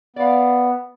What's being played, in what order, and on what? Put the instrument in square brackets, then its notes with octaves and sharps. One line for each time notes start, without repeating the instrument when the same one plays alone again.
[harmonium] B3 [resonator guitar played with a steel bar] D5 F5